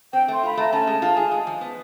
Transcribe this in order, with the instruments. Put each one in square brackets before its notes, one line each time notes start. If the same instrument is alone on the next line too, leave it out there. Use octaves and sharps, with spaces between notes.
[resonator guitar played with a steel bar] C4 [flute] G5
[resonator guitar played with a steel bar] A3 [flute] C6
[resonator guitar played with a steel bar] F4 [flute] B5
[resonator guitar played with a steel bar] A3 [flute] A#5
[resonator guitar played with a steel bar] C#4 [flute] A5
[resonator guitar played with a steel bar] G#3
F4
G#4
G#3
F3
B3